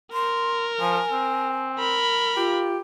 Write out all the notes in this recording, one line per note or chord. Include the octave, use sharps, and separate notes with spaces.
A#4 C6
F3 G#5
C4
A#4 B5
F4 G4